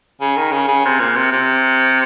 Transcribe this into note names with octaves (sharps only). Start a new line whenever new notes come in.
C#3
D#3
C#3
C#3
C3
A#2
C3
C3